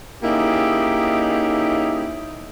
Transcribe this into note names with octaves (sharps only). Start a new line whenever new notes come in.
A#3 C#4 D#4 E4 G4 G#4